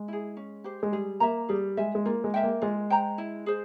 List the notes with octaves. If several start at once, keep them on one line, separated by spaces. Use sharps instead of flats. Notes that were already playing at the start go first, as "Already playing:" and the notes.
Already playing: G#3
E4 G#4
C#4
G4 C5
G#3
G3 G#4
A#3 E5 A#5
G3 G#4
G#3 E5 G#5
G#3
A#3 F4
G#3
A#4 E5 G5
A#3
G#3 F4
C5 G5 A#5
E4
G#4 C5